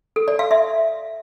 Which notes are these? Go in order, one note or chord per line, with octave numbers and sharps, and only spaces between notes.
A4
D5
F5
E5